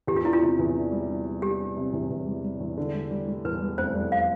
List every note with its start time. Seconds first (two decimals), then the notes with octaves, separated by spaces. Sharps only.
0.07 E2 G4
0.16 F4
0.24 D4 E4
0.33 F4
0.42 C3
0.59 E2
0.75 D4
0.92 G3
1.09 D4
1.26 G3
1.42 G3 G4
1.60 D4
1.76 C3
1.93 E2
2.10 E2
2.27 G3
2.44 G3
2.60 E2
2.77 D3
2.94 G3
3.11 G3
3.28 G3
3.45 E2 B4
3.62 G3
3.78 F1 C5
3.95 G3
4.12 F5